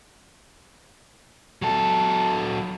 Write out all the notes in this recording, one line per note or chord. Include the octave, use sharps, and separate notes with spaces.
F#3 A4